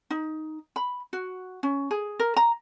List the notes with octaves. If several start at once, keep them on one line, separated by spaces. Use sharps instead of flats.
D#4
B5
F#4
C#4
G#4
A#4
A#5